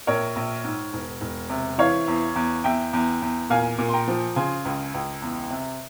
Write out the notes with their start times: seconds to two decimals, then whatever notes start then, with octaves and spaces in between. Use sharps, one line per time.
0.07 A#1 A#4 C#5
0.36 A#1
0.64 G#2
0.93 E1
1.21 E1
1.50 C3
1.78 E3 C#5 F5
2.08 E2
2.36 E2
2.64 E2 E5 G5
2.93 E2
3.22 E2
3.50 A#2 F5 G#5
3.78 A#2
3.88 C6
3.93 G5 A#5
4.08 F3
4.36 C#3 G#5 C6
4.65 C#2
4.94 C#2
5.22 E2
5.50 C3